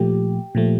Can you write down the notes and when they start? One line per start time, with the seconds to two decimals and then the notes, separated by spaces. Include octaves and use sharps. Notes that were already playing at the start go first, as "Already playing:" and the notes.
Already playing: A#2 F3 A3 G4
0.55 A#2 F3 A3